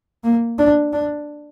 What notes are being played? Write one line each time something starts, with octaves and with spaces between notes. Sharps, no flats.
A#3
D4
D4